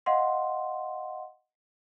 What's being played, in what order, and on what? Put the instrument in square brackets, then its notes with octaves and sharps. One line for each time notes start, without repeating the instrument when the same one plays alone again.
[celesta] D#5 F5 F#5 C6